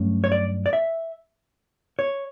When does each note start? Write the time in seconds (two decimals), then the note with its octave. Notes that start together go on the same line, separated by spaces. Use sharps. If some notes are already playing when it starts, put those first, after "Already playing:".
Already playing: G2 F#3 A3 C#4
0.24 C#5
0.32 D5
0.66 D5
0.73 E5
1.99 C#5